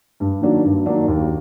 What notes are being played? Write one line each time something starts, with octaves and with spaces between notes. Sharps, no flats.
G2
D#3 F#3 A#3 D4
G2
D#3 F#3 A#3 D4
D#2